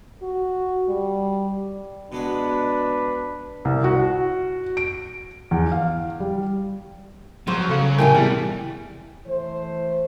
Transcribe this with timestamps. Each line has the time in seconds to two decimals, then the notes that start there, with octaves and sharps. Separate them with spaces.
0.23 F#4
0.89 G3
2.12 B2 G#3 B3 D4 B4
3.65 C2
3.84 F#4
4.77 D7
5.51 E2
5.72 F5
6.20 G3
7.47 F3 F#3 B3 C5
7.69 C#3 A4 F5
7.99 A2 C3 G4 A#4 G5 G#5
8.15 C3 E3 G3 B3 E4 G#4
9.26 E3 A3 C5